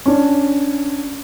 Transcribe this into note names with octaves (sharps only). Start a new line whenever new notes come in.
C#4 D4